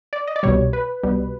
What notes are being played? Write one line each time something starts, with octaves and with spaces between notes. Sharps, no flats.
D5
D#5
D5
C2 B2 G3 C#5
B4
C2 B2 G3